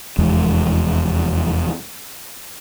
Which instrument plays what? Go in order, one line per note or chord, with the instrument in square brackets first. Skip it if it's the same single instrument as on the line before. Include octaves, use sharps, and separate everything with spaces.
[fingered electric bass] F1 E2 G#3